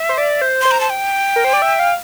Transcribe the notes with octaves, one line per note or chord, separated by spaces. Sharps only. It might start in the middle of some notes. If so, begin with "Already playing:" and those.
Already playing: E5
C5
D5
C5
C5 C6
A#5
A5
G5
A#4
C5
D5
E5
F5